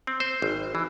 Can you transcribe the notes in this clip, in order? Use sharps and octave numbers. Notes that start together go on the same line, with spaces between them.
C4
C5
G#1
E3